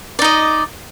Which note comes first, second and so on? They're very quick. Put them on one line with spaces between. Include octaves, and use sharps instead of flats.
D5 D#4 D#5